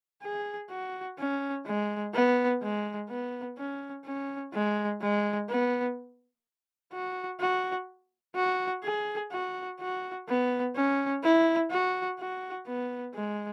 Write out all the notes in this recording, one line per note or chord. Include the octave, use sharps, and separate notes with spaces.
G#4
F#4
C#4
G#3
B3
G#3
B3
C#4
C#4
G#3
G#3
B3
F#4
F#4
F#4
G#4
F#4
F#4
B3
C#4
E4
F#4
F#4
B3
G#3